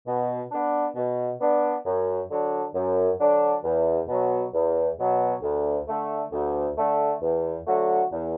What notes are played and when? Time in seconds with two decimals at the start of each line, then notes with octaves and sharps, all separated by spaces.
0.06 B2
0.51 B3 D4
0.95 B2
1.40 B3 D4
1.85 F#2
2.30 D3 F#3 D4
2.74 F#2
3.20 D3 F#3 D4
3.64 E2
4.08 B2 F#3
4.53 E2
4.98 B2 F#3
5.42 D2
5.87 D3 A3
6.32 D2
6.77 D3 A3
7.22 E2
7.67 D3 F#3 A3 F#4
8.12 E2